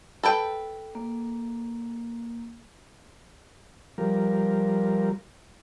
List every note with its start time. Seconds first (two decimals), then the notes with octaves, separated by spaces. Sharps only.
0.23 A4 B4 G5
0.95 A#3
3.98 F3 G3 A#4